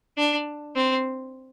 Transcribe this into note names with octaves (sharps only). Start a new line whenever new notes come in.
D4
C4